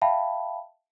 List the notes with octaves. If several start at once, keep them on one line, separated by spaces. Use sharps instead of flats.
E5 F5 G5 A5 B5